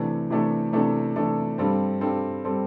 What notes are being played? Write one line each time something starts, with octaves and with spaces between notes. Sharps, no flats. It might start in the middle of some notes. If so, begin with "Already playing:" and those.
Already playing: C3 E3 A3 D4 A4
C3 E3 A3 D4 A4
C3 E3 A3 D4 A4
C3 E3 A3 D4 A4
G2 G3 C4 A4
G2 G3 C4 A4
G3 C4 A4